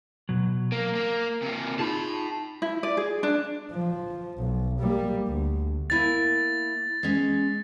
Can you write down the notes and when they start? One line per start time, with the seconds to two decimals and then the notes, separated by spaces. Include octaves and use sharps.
0.29 B2 F#3
0.72 A#3 A#4
0.95 A#3
1.42 C3 A#3
1.79 D#4 F4 G#4 A5 B5
2.62 E4
2.83 D5
2.97 G#4
3.23 D4
3.71 F3
4.37 B1
4.79 G3 A#3
5.28 D2
5.90 A#3 E4 G#5 A6
7.03 G#3 C#4